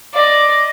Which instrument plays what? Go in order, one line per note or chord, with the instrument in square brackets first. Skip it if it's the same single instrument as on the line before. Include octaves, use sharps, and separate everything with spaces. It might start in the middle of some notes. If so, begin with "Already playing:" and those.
[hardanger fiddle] D5 [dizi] D#5 F5